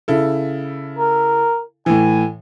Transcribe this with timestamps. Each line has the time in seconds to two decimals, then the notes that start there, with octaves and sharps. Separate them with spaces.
0.08 C#3 E4 A4
0.99 A#4
1.86 A2 E3 G#5